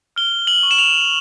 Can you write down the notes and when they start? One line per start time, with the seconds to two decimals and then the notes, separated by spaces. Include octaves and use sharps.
0.16 F6 G7
0.47 F#7
0.63 C#6
0.71 E7
0.79 F7